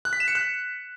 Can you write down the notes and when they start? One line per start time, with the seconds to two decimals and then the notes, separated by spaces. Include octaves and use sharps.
0.05 F#6
0.13 B6
0.20 E7
0.28 C#7
0.35 F#6